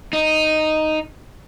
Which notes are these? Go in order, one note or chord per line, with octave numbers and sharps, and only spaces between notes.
D#4